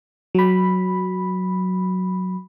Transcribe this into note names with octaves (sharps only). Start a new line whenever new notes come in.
F#3 B5